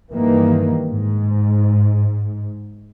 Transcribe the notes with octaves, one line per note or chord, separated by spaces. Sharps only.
G2 D#3 E3 A#3
G#2